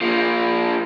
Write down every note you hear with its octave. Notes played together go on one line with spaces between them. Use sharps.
F3 A#3